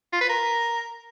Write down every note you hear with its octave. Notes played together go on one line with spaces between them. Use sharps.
F4
B4
A#4